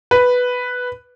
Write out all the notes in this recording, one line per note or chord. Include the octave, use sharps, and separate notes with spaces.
B4